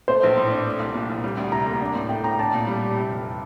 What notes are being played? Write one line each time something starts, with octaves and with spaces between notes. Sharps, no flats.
A3 C5
A#1
A2
D4
A3
C2
A#2
C2
G3
D2
C3 A#5
A#3
D4
A2
A3 G5
A2 A#5
D4 A5
A#2
G3
G4
C3
F1